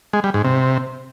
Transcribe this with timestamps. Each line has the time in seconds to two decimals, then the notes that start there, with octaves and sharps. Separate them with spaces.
0.13 G#3
0.24 G3
0.34 G#2
0.45 C3